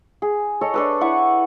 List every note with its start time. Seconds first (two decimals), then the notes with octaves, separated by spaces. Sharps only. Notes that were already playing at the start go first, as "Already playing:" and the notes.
0.22 G#4
0.61 A4 C#5 D#5
0.74 D4 A4 B4
1.01 E4 B4 F#5 C#6